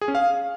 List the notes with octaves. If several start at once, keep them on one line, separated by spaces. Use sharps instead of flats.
G#4
C#4
F5